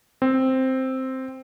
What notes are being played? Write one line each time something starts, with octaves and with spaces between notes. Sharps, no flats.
C4